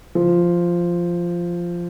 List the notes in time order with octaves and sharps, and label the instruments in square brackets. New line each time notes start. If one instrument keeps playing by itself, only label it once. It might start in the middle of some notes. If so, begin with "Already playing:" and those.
[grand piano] F3